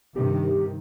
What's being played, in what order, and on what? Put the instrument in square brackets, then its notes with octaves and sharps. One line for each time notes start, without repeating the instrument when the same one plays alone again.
[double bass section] G2 C3 D#3 [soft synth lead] G4